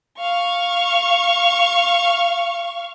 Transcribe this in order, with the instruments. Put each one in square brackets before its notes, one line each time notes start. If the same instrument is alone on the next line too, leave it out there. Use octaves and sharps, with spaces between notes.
[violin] F5 C#6